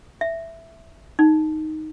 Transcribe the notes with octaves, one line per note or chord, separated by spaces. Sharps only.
E5
D#4